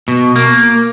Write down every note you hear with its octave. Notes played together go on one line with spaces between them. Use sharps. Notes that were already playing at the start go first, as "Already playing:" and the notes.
B2
A#3